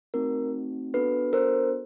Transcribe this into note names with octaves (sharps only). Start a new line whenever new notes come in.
A3 C4 D#4 F#4 A#4
B3 D4 F#4 A4 B4
A#4 C5